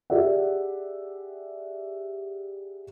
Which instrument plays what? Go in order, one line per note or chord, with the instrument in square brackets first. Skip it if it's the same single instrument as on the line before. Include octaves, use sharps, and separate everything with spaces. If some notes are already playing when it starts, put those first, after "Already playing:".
[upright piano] G4 G#4 D5 E5 F#5